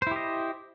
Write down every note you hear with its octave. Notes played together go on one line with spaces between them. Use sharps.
E4 G4 C5 D#5